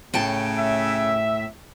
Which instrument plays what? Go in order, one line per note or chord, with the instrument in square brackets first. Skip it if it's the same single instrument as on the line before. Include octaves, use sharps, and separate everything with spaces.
[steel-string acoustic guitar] A2 G5 A5 [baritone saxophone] C#3
[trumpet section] E5